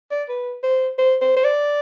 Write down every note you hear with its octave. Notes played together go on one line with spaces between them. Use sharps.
D5
B4
C5
C5
C5
C5
D5